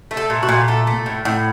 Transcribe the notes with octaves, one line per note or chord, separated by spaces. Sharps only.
A3
A4
A#2
F#4
A#2
A3 A4
A3
A2
A2